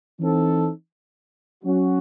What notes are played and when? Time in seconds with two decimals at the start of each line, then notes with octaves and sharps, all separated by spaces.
0.19 E3 C4 D#4 A4
1.64 F#3 C#4 F#4